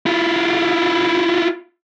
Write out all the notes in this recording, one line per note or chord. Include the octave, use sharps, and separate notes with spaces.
E4 F4